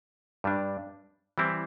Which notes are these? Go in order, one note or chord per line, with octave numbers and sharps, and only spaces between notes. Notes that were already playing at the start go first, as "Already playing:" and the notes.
G2 G3 D4
E3 G3 C4 E4